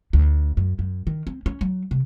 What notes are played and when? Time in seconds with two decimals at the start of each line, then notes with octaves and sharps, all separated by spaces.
0.13 D2
0.57 F#2
0.79 F#2
1.07 D#3
1.27 C4
1.46 C#4
1.61 F#3
1.91 C3